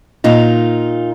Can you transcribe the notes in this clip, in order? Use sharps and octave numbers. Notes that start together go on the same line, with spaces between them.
A#2 D#4 F4